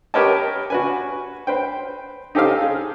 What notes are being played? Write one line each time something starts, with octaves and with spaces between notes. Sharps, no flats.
G4 A#4 B4 C#5 D#5 A5
F#4 B4 G#5
B4 C5 G5
D#4 G4 A4 C5 F5
G#4